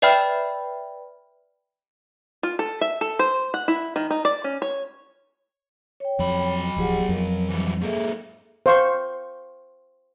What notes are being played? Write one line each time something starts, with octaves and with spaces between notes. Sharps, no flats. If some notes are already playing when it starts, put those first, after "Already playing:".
B4 D5 E5 G5 B5 F6
F4
A4
E5
A4
C5
F#5
E4
D#3
D#4
D5
C#4
C#5
C#5 G5
F2 F#3 B5
D1 F3 G4 G#4 F#5
F2 A#4
E3 F#3 G3
G#2 A#3 G#4 A4 E5
C5 F5 C#6